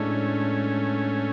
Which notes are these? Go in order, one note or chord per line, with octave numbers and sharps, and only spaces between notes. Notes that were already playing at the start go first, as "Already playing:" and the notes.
Already playing: A2 G#3 A3 C#4 D4